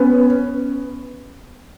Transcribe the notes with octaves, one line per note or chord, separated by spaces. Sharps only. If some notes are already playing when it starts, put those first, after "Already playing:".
Already playing: B3 C#4